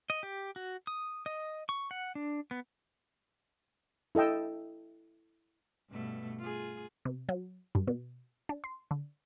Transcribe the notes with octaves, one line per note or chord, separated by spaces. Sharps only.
D#5
G4
F#4
D#6
D#5
C#6
F#5
D4
B3
E4 A4 D#5 G5 E6
G2 B2 A3
F4 G#4
C3
F#3
G2
B2
D4
C6
D3